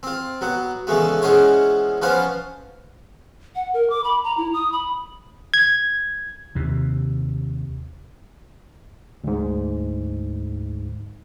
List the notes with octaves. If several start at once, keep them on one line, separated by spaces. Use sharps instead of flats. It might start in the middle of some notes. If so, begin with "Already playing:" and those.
C4 F4
F#3 B3
C#3 E3 G#3 A3 B3
E3 G#3 B3 C#4 C5 C#5
F3 B3 C#4 F4 B4 C5
F#5
A#4
D6
B5
A#5
E4
D#6
B5
G#6
D#2 C3
D2 G#2